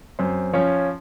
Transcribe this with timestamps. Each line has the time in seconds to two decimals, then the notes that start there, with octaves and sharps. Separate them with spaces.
0.19 F#2 C4 C5
0.53 F3 C#4 C#5